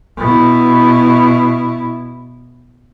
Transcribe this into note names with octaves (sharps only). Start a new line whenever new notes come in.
B2 E4